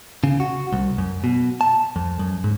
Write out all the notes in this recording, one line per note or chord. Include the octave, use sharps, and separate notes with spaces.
C#3
F#4
C2
F#2
B2
A5
F2
F#2
G#2